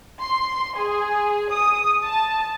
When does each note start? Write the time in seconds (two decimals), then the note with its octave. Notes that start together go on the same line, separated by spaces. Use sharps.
0.21 C6
0.77 G#4
1.52 D#6
2.05 A5